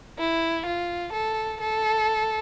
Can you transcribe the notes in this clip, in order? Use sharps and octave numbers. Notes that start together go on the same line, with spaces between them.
E4
F4
A4
A4